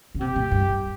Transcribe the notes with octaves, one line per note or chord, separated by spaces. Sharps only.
C#3
C3 G4
A#2
G2